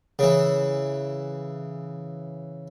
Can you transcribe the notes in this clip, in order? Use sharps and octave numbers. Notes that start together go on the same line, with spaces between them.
C#3 E3